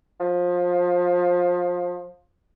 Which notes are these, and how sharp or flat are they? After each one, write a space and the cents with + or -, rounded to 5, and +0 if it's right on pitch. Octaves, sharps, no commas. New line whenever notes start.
F3 +25